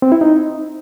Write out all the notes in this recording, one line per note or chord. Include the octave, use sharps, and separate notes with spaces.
C4
E4
D#4